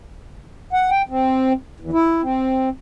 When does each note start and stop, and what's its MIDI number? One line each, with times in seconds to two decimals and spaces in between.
0.73 0.90 78
0.91 1.02 79
1.09 1.53 60
1.80 1.91 40
1.93 2.22 64
2.23 2.69 60